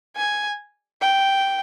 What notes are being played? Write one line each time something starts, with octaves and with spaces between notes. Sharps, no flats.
G#5
G5